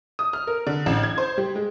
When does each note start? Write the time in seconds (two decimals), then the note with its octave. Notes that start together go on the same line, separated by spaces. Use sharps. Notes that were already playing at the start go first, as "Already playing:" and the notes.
0.19 D#6
0.33 F6
0.47 A#4
0.67 D3
0.86 A1
1.03 G#6
1.18 C5
1.38 G3
1.55 G#3